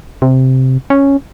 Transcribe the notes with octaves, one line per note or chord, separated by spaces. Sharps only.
C3
C#4